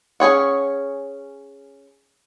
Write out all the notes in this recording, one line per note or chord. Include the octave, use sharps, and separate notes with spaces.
C#4 G#4 C#5 F#5